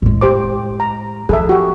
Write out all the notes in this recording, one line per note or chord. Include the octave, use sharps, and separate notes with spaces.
A2 G#3
G4 C5 D6
A#5
F3 G#4 A4 E5
F#4 G4